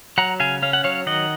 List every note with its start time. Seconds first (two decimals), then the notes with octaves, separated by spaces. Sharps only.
0.18 F#3 F#5 A#5
0.40 C#3 F5 G#5
0.62 C#4 F5
0.73 F#5
0.84 F#3 C#5 F5
1.06 D#3 D#5 F#5